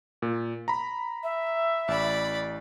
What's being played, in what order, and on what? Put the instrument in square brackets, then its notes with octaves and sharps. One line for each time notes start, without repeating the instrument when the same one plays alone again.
[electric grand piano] A#2
A#5 B5
[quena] E5
[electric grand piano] A1 [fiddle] D5 B5